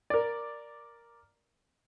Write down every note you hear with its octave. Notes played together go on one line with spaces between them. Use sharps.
A#4 D5